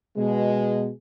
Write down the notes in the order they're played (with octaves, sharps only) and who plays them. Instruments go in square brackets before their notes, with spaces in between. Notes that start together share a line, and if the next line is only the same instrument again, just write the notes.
[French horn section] B2 G#3